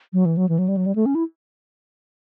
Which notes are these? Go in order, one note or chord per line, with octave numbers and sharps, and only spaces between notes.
F#3
E3
F#3
E3
F#3
G3
F#3
G3
A3
C#4
E4